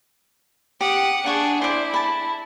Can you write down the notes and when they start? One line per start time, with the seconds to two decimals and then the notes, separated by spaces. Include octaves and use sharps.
0.81 G4 F#5 D#6
1.26 D4 G#4 F#5 C#6
1.62 E4 C5 D5
1.94 A5 B5